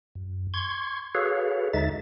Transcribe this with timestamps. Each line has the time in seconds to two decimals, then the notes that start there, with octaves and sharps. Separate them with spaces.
0.15 F#2
0.54 C6 C#6 G#6
1.15 F#4 G#4 A4 B4 C#5 F5
1.74 D#2 D3 G#3 D#4 E5 A6